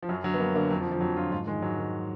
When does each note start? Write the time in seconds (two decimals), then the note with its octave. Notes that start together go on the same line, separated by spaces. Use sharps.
0.03 F3
0.09 F#2 F#3
0.23 D3 F#3
0.34 B3
0.39 F#2 A#3
0.55 D3 A#3
0.71 F2 F#3
0.81 F3
0.86 D3
0.91 F3
1.01 F2 F#3
1.17 D3 F4
1.32 G#2 F4
1.47 D#3 G#3
1.62 G#2 F#3
1.79 D#3